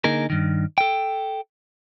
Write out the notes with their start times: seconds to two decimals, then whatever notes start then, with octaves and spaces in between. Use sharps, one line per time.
0.04 D3 A#3 D#4 G#4 A#4
0.30 G2 D#3
0.78 A4 G5